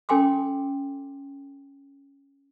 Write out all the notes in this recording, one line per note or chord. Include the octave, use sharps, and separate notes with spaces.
C#4 A4 G5 G#5 C6 D6